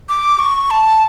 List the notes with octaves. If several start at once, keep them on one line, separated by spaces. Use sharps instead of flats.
D6
C#6
A5